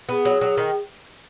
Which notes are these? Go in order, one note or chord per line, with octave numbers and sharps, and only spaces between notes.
B3 G#4
F#3
F#3
D#3